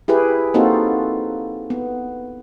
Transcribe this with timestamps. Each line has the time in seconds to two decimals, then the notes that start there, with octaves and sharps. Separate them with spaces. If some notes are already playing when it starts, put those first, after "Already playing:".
0.08 E4 G4 G#4 B4
0.54 A#3 C4 D#4 F4 F#4 A4
1.70 B3